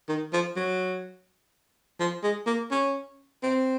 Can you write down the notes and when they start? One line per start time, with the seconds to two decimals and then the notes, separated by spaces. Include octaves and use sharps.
0.08 D#3
0.33 F3
0.56 F#3
2.00 F3
2.23 G#3
2.47 A#3
2.71 C#4
3.43 C4